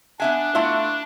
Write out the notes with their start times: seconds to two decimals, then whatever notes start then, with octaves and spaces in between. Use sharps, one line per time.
0.20 B3 D4 E5 G#5
0.55 A3 B3 E4 F4